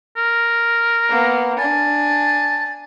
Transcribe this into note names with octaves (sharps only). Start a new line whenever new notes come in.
A#4
A#3 B3
D4 G#5 A5